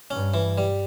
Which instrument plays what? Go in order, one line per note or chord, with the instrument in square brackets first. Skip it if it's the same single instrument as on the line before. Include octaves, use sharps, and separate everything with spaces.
[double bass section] G2 [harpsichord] C#4
[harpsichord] E3
G3